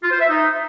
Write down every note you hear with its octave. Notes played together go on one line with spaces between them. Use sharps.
F4
C5
E5
D#4